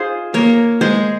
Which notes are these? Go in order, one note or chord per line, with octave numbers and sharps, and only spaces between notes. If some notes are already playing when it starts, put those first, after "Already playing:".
Already playing: D#4 F4 G#4 C5
A#3 A#4 C#5
G#3 G#4 C5